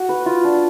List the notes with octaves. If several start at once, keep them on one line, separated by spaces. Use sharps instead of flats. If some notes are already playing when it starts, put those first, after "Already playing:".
Already playing: F#4
B4
F4
D4